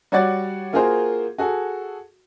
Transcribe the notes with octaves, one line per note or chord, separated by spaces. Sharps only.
G3 F#4 C#5 D5 F#5 A6
A#3 F4 F#4 G#4 A#4 C5
F#4 G#4 A4